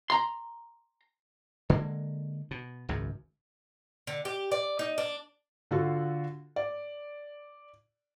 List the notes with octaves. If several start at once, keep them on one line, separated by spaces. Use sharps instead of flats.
A#5 C6
D3 G#3 A#3
B2
G#1 C#2 F#2
D3
G4
D5
D#4
D4
D3 F4 F#4 A4
D5